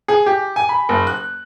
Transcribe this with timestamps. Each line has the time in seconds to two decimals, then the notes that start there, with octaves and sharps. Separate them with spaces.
0.08 G#4
0.26 G4
0.56 G#5
0.69 B5
0.89 F#1
1.07 F#6